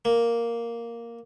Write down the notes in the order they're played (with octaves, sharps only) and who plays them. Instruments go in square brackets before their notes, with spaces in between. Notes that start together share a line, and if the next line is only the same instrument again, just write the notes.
[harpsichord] A#3